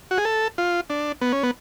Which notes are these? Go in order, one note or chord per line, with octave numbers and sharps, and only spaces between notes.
F#4
G#4
A4
F4
D4
B3
C#4
B3